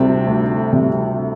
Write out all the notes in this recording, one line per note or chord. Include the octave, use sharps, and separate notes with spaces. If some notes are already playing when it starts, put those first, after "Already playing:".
Already playing: D2 C3 G3 C4
D2
C3 G3 C4